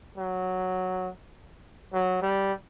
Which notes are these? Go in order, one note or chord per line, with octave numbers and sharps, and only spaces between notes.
F#3
F#3
G3